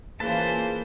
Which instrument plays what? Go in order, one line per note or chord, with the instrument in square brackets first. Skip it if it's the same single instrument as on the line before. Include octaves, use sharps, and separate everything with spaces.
[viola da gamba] E3 A#3 C5 [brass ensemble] C#4 F4 G#4 [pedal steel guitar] B4 A5